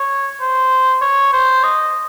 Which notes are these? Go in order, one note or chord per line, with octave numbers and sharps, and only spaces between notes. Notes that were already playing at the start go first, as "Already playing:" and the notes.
Already playing: C#5
C5
C#5
C5
D#5